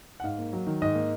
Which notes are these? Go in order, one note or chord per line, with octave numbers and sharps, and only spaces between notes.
F#5
G#2 F5
A#3
F#3
D#3
G#2 D#5
A#3